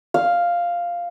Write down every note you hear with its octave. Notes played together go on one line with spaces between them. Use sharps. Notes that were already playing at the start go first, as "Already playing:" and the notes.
F5